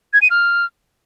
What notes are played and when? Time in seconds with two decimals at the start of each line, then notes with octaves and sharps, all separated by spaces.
0.13 G#6
0.22 D#7
0.30 F6